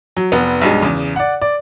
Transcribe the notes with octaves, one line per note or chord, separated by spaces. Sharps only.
F#3
F1 B3
B1 G2 G#3
E2 C#3
D5 F#5
D5